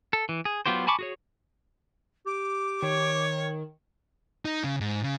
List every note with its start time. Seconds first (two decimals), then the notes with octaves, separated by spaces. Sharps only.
0.13 A4
0.29 E3
0.45 G#4
0.66 F#3 B3 F4 G4 C5
0.87 G#5 A5 B5 C#6 D6
0.99 F#4 G#4 C#5
2.26 G4 D6
2.82 D#3 C#5
4.45 D#4
4.64 C#3
4.80 G#2
5.03 C#3